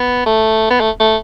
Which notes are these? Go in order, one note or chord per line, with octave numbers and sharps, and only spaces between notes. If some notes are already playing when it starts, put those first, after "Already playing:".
Already playing: B3
A3
B3
A3
A3